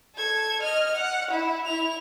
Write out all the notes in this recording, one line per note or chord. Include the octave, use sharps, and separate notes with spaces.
A4 G#6
D#5 F6
F#5
E4
E4 F7